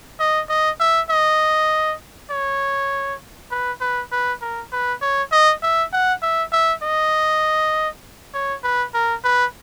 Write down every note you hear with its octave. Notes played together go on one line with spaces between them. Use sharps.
D#5
D#5
E5
D#5
C#5
B4
B4
B4
A#4
B4
C#5
D#5
E5
F#5
E5
E5
D#5
C#5
B4
A#4
B4